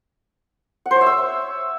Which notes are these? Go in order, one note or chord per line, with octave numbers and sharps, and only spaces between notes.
F#5
C5
C#5
E5
E6